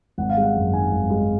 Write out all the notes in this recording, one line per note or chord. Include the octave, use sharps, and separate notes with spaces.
G#1 F#5
F5
G#3 F#5
F#2
D#3 G#5
G#1
G#3